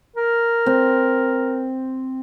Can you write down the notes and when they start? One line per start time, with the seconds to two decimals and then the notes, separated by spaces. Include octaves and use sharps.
0.16 A#4
0.66 C4